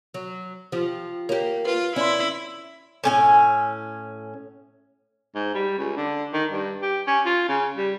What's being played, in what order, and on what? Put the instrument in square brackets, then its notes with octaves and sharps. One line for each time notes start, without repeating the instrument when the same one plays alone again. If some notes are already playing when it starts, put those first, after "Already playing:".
[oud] F#3
F3 G4
[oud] A#3 G4 [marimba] C#5
[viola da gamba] F4 [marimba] B4
[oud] C#4 [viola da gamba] E4 [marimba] D5 C6
[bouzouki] A2 C#4 G#5
[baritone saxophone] G#2
G3
C#2
D3
D#3
G2
G4
C#4
F4
C#3
G3